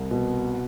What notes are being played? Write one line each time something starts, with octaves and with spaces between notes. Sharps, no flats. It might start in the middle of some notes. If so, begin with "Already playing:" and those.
Already playing: C2
B2